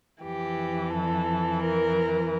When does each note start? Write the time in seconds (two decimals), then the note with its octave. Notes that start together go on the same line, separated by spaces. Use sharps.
0.25 F2 E3 G4
0.94 A4
1.62 A#4